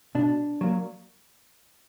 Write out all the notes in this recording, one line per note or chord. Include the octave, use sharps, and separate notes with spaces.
B2 D4
F#3 A#3